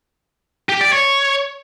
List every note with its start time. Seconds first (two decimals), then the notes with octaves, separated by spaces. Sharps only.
0.69 G4
0.81 D5
0.92 C#5